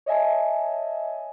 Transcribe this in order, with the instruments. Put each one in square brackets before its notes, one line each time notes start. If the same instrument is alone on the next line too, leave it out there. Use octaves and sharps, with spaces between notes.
[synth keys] C#5 D#5 E5 G#5 A5